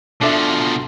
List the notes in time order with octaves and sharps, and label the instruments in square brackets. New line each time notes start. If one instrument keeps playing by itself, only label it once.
[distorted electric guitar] B2 F3 [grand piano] D4 A4 E5